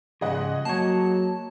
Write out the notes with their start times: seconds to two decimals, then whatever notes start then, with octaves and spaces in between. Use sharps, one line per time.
0.21 G#2 C#3 F3 G#4 D#5 F#5
0.65 F#3 A#3 C#5 A5